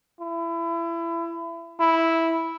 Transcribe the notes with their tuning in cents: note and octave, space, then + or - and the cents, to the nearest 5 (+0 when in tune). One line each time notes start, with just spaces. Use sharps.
E4 +30
E4 -10